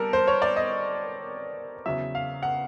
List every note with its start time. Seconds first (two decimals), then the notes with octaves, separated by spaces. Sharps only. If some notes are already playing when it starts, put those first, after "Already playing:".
Already playing: G3 B3 A4 A#4
0.13 C5
0.28 C#5
0.42 D5
0.56 D#5
1.86 E2 C#3 F#3 E5
2.15 F5
2.43 F#5